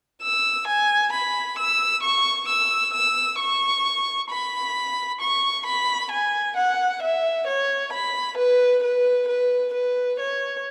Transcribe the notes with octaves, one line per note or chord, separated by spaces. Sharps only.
E6
G#5
B5
E6
C#6
E6
E6
C#6
B5
C#6
B5
G#5
F#5
E5
C#5
B5
B4
B4
B4
B4
C#5